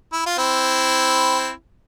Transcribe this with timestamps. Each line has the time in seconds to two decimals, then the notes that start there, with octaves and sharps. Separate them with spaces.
0.13 E4
0.26 F4
0.38 C4 E4